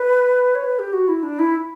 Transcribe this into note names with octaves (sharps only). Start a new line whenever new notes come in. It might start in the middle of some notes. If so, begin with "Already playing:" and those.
Already playing: B4
C#5
B4
G4
F#4
E4
D4
E4